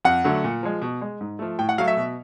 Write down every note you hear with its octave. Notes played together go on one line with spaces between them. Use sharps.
F2 F#5
D3 F#3 A3
A#2
F3 G#3
B2
G#3
G#2
F3 A3
A2 G5
F#5
F#3 A3 F5
E5
B2